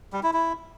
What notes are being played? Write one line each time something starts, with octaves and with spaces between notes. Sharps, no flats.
G3
E4
E4